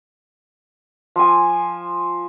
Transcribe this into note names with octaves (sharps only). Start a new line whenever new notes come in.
F3 G#5